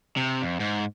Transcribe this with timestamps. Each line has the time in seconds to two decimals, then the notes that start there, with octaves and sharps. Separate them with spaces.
0.17 C3
0.42 F2
0.60 G#2